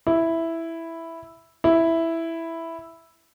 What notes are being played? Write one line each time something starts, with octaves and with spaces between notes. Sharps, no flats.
E4
E4